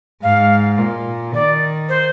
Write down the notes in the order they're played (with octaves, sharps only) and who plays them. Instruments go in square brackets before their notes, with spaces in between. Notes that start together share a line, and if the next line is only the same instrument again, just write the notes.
[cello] G#2 [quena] F5
[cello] A#2
[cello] D#3 [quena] D5
[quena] C5